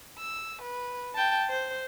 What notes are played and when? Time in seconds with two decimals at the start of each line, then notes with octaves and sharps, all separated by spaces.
0.19 E6
0.61 B4
1.14 G5 A5
1.49 C5